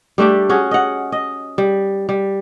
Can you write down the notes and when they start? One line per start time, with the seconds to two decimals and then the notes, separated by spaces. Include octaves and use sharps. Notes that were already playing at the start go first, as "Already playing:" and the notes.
0.18 G3 A3 D4 G4
0.49 C#4 F#4 G#4
0.71 D#5 F#5
1.12 D#5
1.58 G3
2.09 G3